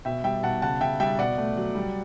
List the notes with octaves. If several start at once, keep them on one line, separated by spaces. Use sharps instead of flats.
B2 E5 G5
G3 E5 G5
B2 F#5 A5
C#3 F#5 A5
C#3 E5 G5
G3 E5 G5
B2 D5 F#5
A3
F#3
G3